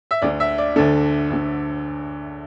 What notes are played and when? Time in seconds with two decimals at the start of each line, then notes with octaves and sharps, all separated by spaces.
0.11 E5
0.22 D2 D3 D5
0.40 E5
0.58 D5
0.76 D2 D3 A4
1.30 D2 D3